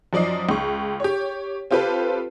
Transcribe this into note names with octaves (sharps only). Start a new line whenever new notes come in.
F#2 F3 D5 D#5 C7
C#2 C#6
G4 C#5
C4 F4 G4 A4 B4